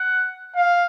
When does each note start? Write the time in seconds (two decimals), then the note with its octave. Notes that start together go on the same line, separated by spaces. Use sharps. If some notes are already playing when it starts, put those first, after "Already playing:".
Already playing: F#5
0.56 F5